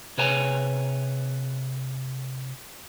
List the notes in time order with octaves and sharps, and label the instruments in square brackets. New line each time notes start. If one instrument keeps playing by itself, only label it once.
[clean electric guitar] C3 G#4 B4 C#5 G#5 A#5